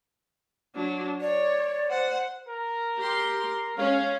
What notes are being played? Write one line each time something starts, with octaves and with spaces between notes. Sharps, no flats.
F#3 D4
C#5 D5
C5 F#5
A#4
G4 C6
G#3 C#4 F5